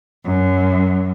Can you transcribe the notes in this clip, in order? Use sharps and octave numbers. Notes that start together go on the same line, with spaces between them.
F#2